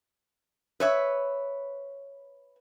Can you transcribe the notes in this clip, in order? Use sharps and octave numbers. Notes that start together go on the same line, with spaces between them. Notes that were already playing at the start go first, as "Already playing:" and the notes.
B4 C#5 E5